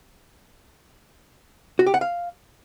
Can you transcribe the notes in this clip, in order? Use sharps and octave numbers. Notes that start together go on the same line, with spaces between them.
F#4
G4
F#5
F5